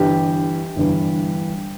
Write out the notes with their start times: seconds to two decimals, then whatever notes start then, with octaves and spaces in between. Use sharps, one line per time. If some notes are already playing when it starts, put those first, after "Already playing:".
Already playing: G1 G2 E3 G4
0.76 G1 G2 E3